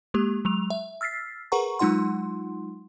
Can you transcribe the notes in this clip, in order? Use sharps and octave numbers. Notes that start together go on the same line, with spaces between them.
G#3 A#3 G4
F#3 G#3 F7
E5
E6 F6 A6 B6 C7
G#4 A#4 B4 F#5 A#5 C#6
F#3 G#3 D#4 F4 F#5 C6